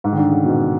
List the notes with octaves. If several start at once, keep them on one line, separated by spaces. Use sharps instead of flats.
G#2
D#3
D3
C#3
B2